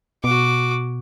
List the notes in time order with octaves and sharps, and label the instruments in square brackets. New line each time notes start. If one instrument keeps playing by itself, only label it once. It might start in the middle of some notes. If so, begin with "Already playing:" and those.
[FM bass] B2 [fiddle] F#4 D6